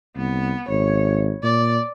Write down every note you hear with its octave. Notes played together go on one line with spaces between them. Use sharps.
C2 B3
G#1 C#5
A#2 D5